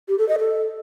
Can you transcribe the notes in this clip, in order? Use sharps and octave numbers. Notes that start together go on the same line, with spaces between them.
G4
A4
D#5
A4